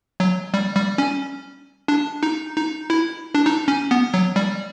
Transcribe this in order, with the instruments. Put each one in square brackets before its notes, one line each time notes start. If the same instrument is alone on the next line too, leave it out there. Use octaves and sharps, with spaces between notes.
[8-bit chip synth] F#3
G3
G3
C#4
D4
D#4
D#4
E4
D4
D#4
C#4
B3
F#3
G3